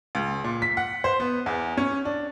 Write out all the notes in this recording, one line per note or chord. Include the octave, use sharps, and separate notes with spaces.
C#2
A#2
B6
F#5
C5
B3
E2
C#4
D4